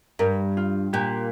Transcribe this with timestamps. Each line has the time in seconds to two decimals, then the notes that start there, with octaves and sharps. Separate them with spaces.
0.19 G2 A#4
0.57 F4
0.93 A#2 G4